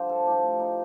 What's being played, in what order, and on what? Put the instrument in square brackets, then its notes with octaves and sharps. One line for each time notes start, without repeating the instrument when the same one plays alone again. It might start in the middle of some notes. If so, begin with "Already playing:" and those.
Already playing: [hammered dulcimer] G2 D3 F3 F4 G4 C5
A4
A2 F3 G4
D#4